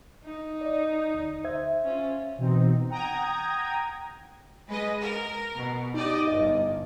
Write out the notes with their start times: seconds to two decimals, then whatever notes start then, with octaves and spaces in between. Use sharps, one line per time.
0.24 D#4
0.61 D5 D#5
1.14 D2
1.44 C5 E5 G#6
1.84 C#4 F4
2.38 B2 E3 C4 D#4
2.89 F#5 G5 A#5 D#6 G#6
4.67 G#3 B4 D#5
5.02 A#4
5.56 B2
5.94 D#4 G4 D5 D#5
6.28 G1 D#5